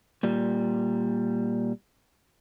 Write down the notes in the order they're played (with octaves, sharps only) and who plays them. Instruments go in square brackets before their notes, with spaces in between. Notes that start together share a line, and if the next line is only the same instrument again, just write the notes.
[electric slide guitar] A#2 G3